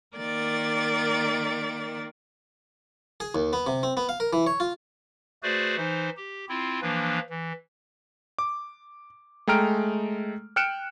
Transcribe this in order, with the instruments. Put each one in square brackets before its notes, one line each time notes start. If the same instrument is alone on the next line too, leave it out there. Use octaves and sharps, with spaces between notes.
[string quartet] D#3 A#3 A#4 D5 A6
[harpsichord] G#4
D#2
B3
C3
C4
B3
F5
A#4
E3
C#5
F4
[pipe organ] A3 F#4 G#4 B4 C5 D5
E3 D#4 C5
G4
C4 E4 F4
E3 F3 A#3 D4 B4
E3
[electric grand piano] D6
G#3 A3 G5 A#5 F6 D7
G5 F6 F#6 C#7 D7 E7